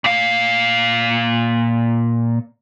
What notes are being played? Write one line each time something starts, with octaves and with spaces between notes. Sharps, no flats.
A#2 F5